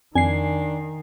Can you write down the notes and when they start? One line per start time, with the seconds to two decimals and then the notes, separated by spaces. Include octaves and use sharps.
0.15 F2 D#3 D4 G#5 C7